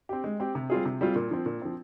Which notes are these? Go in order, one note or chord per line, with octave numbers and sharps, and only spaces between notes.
C4 G4
G#3
C4 G4
C3
G3 C4 F4 G#4
C3
G3 C4 F4 G#4
A#2
F3 C4
A#2
F3 C4